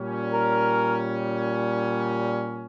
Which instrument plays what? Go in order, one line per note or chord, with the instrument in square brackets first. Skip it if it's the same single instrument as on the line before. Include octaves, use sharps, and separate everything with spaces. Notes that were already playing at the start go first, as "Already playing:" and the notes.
Already playing: [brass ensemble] A#2 G3 C#4
[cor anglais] A#4